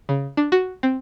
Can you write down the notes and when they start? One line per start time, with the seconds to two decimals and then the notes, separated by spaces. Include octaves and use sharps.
0.09 C#3
0.37 D4
0.52 F#4
0.83 C4